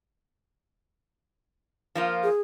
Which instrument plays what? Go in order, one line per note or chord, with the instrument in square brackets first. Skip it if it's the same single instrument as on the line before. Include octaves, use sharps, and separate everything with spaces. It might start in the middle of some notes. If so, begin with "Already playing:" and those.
[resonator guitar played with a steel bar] F3 A#3 F4
[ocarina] G#4